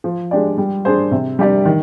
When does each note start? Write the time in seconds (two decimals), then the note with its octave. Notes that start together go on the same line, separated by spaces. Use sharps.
0.04 F3
0.31 G#3 D4 G4 D5
0.58 G3
0.85 D4 G#4 C5
1.11 C3
1.39 G3 D4 G4 D5
1.65 D#3